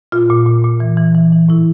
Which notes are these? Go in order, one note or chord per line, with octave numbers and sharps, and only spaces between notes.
A#2 F4
A#2
A#2
A#2
E3
E3
E3
E3
A2 E4